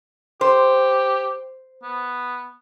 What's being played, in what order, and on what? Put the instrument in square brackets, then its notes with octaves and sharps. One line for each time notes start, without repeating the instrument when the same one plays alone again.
[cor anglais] G4 [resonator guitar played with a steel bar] C5
[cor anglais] B3